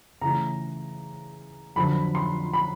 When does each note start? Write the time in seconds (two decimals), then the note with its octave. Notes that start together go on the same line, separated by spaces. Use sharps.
0.21 C#3 E3 A3 A#5
1.76 F2 D3 F#3 B5
2.15 C6
2.53 B5